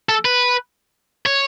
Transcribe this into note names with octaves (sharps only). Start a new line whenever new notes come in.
A4
B4
C#5